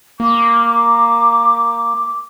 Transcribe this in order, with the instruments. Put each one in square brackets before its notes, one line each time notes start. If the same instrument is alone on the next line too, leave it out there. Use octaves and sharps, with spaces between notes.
[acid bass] A#3 [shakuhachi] D6